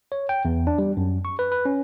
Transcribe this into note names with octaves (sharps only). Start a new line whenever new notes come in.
C#5
G5
E2
D4
G3
F#2
C#6
B4
B4
C#4